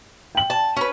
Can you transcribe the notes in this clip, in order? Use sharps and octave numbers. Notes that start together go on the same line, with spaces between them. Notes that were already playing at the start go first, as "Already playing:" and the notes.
G5 F#7
A5
C#4 B4